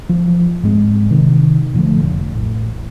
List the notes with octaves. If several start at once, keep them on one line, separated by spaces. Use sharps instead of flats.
F3
G#2 G#3 C4
C3 D#3
A#2 D3 F3 A3
F1
A1